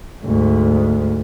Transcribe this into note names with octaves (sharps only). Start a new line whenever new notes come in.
D2 G#2